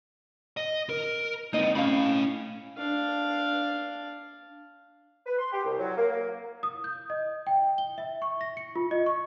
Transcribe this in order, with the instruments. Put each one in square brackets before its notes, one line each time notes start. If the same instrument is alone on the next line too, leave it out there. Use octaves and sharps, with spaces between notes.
[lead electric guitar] D#5
A#4
[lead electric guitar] A#3 C4 [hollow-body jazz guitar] D#4 D#5
[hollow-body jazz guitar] A2 F5 [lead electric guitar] C#4 B5
[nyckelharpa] D4 F5
[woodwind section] B4
C6
G4
C2
F#3
A#3
A#3
[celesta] D#6
G6
D#5
G5
G7
E5
C#6
A#6
C#7
F4
D#5
C#6